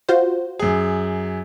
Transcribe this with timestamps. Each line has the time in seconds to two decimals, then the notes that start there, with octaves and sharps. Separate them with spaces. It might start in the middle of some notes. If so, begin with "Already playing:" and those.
0.09 F4 F#4 C5
0.59 F#2 G#4